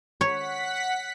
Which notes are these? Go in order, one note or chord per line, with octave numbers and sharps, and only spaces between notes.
C#5 F#5 B6